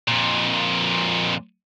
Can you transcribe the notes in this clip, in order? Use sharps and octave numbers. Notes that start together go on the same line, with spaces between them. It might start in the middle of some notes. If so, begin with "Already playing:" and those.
F2 A#2